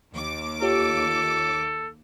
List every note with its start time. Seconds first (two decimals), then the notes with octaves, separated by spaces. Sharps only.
0.14 D#2 D6
0.62 F4 G4 A4 C#5